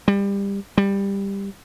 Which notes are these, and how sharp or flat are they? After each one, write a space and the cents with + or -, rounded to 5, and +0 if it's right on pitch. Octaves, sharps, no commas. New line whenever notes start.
G3 +25
G3 +15